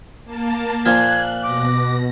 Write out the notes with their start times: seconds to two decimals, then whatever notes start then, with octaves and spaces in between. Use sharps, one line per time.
0.25 A#3 A5
0.86 A#2 F3 F#6 G#6
1.43 B2 D6 A#6